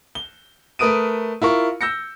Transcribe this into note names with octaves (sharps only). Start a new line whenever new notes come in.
G7
A3 A#4 B4 D#6 D7 D#7
E4 F4 A#4 C#6
E6 G6 A#6 C#7